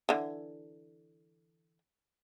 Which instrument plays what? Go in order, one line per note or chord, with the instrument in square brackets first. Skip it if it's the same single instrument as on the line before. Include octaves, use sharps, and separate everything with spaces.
[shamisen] D3 E3